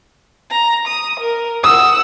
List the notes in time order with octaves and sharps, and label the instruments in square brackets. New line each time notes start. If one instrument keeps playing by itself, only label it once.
[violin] A#5
D#6
A#4
[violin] F#5 E6 [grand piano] D#6